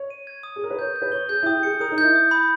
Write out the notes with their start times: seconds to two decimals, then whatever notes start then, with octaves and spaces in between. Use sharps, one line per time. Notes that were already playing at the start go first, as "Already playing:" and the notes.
Already playing: C#5
0.10 D#7
0.27 G#6
0.43 D#6
0.56 G#4
0.61 A#4 D#6
0.70 B4
0.79 C#5 G6
0.96 G6
1.02 B4
1.12 C#5 G7
1.29 G#4 G6
1.43 E4
1.46 G4 D#6
1.63 G#4 C#7
1.80 A#4 D#6
1.91 D#4
1.98 G6
2.04 E4
2.15 D#6
2.31 B5